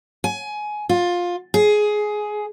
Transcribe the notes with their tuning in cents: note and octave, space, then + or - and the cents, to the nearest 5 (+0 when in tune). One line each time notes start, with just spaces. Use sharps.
G#5 +20
F4 +15
G#4 +15